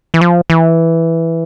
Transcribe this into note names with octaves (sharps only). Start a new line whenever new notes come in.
E3
F3
E3